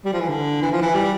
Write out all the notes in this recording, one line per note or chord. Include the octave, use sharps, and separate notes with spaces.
G3
F3
E3
D3
E3
F3
E3
G3